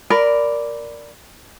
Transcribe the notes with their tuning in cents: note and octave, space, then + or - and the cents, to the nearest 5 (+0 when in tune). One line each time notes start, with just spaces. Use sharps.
A#4 +0 D5 -5 B5 +15